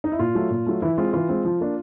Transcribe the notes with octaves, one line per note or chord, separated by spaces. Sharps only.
D#4
E4
A#2 F4
F#3 A3
A#2
F#3 A3
E3 E4
G#3 C4 F4
E3 F4
G#3 C4
F3
A#3 D4